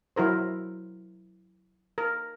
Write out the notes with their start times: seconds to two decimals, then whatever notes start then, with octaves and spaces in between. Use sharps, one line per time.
0.16 F#3 E4 A#4 C5
1.98 A#4